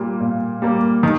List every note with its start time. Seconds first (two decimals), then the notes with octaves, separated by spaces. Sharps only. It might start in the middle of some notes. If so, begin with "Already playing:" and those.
Already playing: A#2 G3 A#3
0.20 A#2
0.62 G3 A#3
1.03 D#3